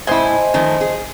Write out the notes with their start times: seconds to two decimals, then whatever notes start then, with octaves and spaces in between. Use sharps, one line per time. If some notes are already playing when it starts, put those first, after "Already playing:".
0.07 A2 E4 C5 D#5 G#5
0.54 D#3 F3 A3
0.81 G#4